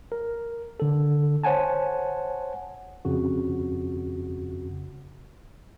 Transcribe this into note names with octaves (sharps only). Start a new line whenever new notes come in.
A#4
D3 A4
C5 C#5 F#5 G#5 A5
F2 C#3 F#4